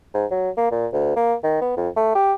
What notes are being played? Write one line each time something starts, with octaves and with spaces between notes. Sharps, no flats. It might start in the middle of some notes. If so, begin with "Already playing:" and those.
G#2
F#3
A#3
A#2
D2
A#3
D#3
B3
F2
A3
G4